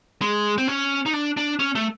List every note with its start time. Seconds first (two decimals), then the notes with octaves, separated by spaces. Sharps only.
0.22 G#3
0.58 C4
0.68 C#4
1.06 D#4
1.13 D4
1.37 D4
1.59 C#4
1.75 A3